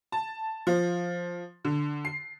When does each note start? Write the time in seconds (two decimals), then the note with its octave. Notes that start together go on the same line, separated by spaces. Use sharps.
0.12 A5
0.67 F3
1.65 D3
2.05 C7